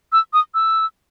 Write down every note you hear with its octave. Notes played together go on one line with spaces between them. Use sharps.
E6
D#6
E6